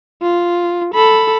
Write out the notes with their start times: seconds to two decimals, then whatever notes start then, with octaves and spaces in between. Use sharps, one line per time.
0.22 F4
0.94 A4 B5